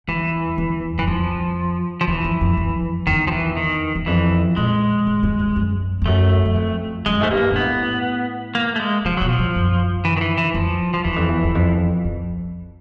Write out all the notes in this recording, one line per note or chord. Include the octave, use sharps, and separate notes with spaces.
E2 E3
E2
F#2 E3
F2 F3
F3
E2 E3
F2
F2
F2
E2 D#3
F3
E3
D#3
E2
F2 E3
A#2 G#3
A2
G#2
G2
F#2
F2
F#2 A3
F#2
F2
F#2 G#3
G#2 A3
G2 A#3
A#2
A2 B3
A#3
A3
G#3
C3 F3
B2 F#3
F3
A2
F#2
E3
D#3
E3
E3
F2 F3
F3
E2 E3
F2
E2
E2
F2
F2